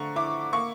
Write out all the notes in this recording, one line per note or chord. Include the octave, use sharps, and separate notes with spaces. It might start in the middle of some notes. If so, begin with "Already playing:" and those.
Already playing: D3 F3 A3 A#5 C#6
E4 D6
A#3 C#6